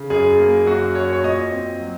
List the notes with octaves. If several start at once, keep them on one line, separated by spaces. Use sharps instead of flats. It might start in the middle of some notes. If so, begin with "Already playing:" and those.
Already playing: C#3
F#2 G#4
A#3
F#2 F#4
F#2 C#5
C#5
A#2 D#5
C4
F#3